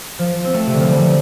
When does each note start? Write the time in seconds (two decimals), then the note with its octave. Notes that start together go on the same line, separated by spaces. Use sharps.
0.19 F3
0.45 C4
0.54 A3
0.67 C3
0.74 D3
0.81 F3
0.89 G3